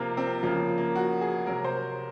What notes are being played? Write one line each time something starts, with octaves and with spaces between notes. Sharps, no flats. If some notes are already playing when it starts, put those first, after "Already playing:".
Already playing: C3 F3 A#3 C4 F4
C4
C#3 F3 A#3
A#3
F#4
G#4
C3 F#3 A#4
C5